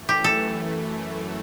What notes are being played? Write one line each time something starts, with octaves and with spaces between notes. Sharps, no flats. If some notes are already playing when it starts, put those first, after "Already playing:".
Already playing: F#2 E3 A3
G4
A4